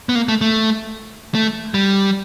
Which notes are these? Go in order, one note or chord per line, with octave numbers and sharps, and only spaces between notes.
B3
A#3
A3
A3
A3
G3